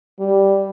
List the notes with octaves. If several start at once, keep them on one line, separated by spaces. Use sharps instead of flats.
G3